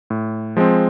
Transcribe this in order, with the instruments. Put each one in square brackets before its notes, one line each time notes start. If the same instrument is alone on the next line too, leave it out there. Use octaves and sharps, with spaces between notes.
[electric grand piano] A2
F3 G#3 C4